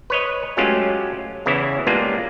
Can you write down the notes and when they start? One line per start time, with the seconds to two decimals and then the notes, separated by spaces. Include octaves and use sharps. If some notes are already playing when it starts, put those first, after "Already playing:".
0.10 B4 C#5 D#5
0.57 F#3 G#3 A3 C#4 F4 G4
1.46 E2 C#3 E3 C#4 E4
1.87 G3 G#3 A#3 B3 D4 F4